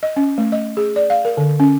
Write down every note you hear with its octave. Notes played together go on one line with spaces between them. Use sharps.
D#5
C#4
A3
D#5
G#4
D5
F5
A#4
D3
C#4